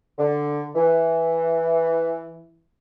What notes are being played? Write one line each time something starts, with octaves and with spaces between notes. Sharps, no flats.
D3
E3